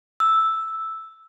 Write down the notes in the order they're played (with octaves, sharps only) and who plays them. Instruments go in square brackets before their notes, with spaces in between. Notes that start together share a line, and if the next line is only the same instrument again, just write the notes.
[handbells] E6